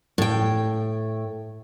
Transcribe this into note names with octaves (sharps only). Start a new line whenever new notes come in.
A2 G5